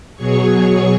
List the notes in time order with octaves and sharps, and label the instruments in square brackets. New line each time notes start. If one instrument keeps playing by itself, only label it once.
[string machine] B2 F#3 G#4 C#5 C#6